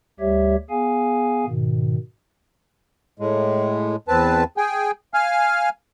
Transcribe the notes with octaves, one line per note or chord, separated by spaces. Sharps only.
D2 G3 G4 C#5 E5
B3 G#4 F5 G#5
G#2 B2 D#3
A2 G#3
E2 C4 B4 A5
G#4 G5 G#5
F5 G#5 F6